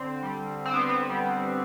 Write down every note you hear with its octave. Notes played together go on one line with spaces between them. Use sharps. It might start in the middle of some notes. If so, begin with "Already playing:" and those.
Already playing: D3 C4
G3
D3 C4
B3
B3
G3